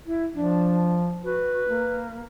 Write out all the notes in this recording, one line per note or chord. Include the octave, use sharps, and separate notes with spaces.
E4
F3 D4
F#4 B4
A#3